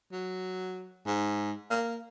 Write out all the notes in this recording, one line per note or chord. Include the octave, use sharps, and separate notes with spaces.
F#3
G#2
A#3